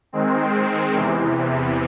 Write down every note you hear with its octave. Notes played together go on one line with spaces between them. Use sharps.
D#3 G#3 C4
E2 C3 E3